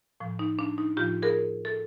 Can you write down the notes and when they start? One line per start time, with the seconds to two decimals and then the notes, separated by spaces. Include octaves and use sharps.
0.20 A2 F3
0.39 D#4
0.59 D4
0.78 D#4
0.97 A2 F3 F4 G4
1.22 G#4 A#4
1.65 A4